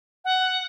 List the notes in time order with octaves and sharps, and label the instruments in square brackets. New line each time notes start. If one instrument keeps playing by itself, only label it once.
[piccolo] F#5